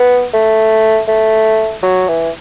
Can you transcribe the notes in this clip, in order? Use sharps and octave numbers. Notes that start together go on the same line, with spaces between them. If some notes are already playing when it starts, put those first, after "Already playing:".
Already playing: B3
A3
A3
F#3
E3